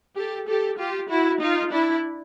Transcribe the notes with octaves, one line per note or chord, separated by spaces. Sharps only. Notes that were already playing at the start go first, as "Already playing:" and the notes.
G4 A4
G4 A4
F4 G4
E4 F#4
D#4 F4
D4 E4